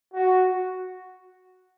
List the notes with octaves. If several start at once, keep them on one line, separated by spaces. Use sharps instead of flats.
F#4